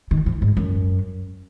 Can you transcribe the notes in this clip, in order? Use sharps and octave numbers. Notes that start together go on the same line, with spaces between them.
D#3
F3
G#2
F#2